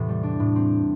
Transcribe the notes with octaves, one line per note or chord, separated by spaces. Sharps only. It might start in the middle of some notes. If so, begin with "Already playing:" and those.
Already playing: E2 A2 C3 E3 C4 A4
G3
D4
A2
C4